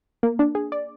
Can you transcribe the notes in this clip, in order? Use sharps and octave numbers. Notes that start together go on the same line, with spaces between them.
A#3
D4
G#4
D5